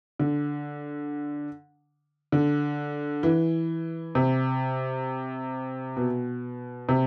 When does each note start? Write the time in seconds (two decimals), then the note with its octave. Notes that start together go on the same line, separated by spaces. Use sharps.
0.19 D3
2.32 D3
3.23 E3
4.15 C3
5.97 B2
6.89 C3